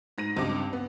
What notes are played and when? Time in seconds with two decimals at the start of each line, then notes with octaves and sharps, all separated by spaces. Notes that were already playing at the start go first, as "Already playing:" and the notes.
0.18 G#2 A#6 D#7
0.37 C#2 G2 C4 D6
0.73 B3